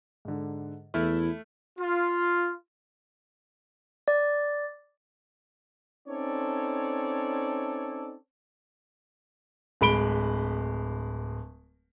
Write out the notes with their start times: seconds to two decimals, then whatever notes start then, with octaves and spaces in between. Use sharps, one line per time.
0.25 G#2 D3
0.94 E2 A3 E4 F6
1.78 F4
4.08 D5
6.09 C4 C#4 D#4 A4 C#5 D5
9.81 D1 G#3 B5 D7 G7